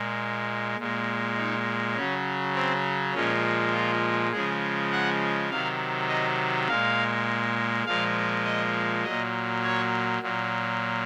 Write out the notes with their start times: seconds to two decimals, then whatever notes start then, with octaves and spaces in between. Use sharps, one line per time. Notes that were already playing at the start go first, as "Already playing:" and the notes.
Already playing: A#2 G#3
0.79 A#2 G#3
1.37 D#4
1.96 C#3 F#3 C#4
2.55 C4
3.14 A#2 F3 G#3 C#4
3.73 F4
4.32 C#3 F3 G#3 G#4
4.92 F#5
5.50 C3 D#3 F#3 F5
6.09 D#5
6.68 A#2 G#3 F5
7.86 A#2 F3 G#3 F5
8.45 D#5
9.04 A#2 F#3 D#5
9.64 C#5
10.22 A#2 F#3